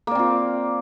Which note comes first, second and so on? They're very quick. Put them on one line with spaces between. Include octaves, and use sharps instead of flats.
A#3 D5 C4 F4